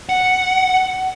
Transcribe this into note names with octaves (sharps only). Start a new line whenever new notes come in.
F#5